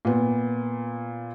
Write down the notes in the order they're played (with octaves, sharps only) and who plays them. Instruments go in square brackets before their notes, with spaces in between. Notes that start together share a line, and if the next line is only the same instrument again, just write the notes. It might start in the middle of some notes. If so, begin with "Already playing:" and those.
[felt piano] A#2 B3